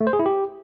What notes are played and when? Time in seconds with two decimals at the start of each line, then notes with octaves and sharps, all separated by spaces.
0.01 A3
0.07 C5
0.13 G#4
0.19 E4
0.26 G4